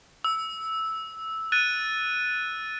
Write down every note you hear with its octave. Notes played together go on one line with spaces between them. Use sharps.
E6
F#6 A6 D#7